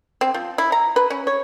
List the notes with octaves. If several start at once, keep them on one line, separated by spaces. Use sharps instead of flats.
C4
F3
E4
A#5
B4
C#4
C#5